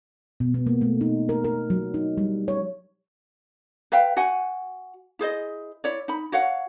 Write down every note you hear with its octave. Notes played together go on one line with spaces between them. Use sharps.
B2
B3
A#3
A3
D#4
A#4
A#4
F#3
D#4
G3
C#5
B4 E5 F5 G5
F#4 F#5 G#5
E4 G#4 C5 D#5
E4 C#5 D5
D#4 B5
F#4 C#5 F5 F#5